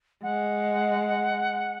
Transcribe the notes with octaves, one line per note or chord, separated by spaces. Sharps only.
G#3 F#5